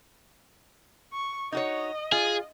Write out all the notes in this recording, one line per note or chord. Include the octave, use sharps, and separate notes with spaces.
C#6
D#4 F#4 C#5 D#5
F4 G#4